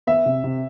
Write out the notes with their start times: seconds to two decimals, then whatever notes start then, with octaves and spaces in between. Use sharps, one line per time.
0.07 B3 E5
0.26 C3
0.44 C3